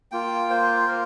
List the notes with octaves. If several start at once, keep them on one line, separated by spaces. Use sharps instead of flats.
A#3 F4 G5
C5
A#4